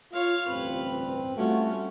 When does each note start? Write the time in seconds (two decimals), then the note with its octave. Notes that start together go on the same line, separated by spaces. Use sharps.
0.12 F4 C#5 F5
0.48 A1 D2 G2 C4 B4
1.37 G3 A3 C#4 F4 F#4